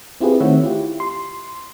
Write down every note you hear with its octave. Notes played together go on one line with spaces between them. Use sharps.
C4 E4 F4 G4 G#4 B4
D#3 A3 C4 C#5 E5 F#5
E4 F4 G4
C6